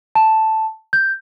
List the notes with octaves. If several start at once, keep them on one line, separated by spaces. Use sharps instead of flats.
A5
G6